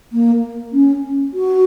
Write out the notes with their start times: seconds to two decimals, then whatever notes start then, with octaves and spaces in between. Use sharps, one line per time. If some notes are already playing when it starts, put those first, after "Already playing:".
0.13 A#3
0.73 C#4
1.34 F#4